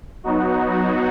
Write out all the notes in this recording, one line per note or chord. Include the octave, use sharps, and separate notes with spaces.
F#3 B3 D#4 F#4